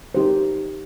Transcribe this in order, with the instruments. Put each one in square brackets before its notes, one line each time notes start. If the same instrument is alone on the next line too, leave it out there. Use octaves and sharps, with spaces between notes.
[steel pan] D#4 G4 C5